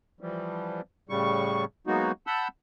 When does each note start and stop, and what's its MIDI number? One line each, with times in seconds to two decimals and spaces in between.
0.21 0.81 52
0.21 0.81 53
0.21 0.81 55
1.09 1.65 45
1.09 1.65 49
1.09 1.65 55
1.09 1.65 85
1.87 2.12 54
1.87 2.12 56
1.87 2.12 58
1.87 2.12 59
1.87 2.12 63
1.87 2.12 66
2.27 2.48 78
2.27 2.48 81
2.27 2.48 83
2.27 2.48 88
2.27 2.48 91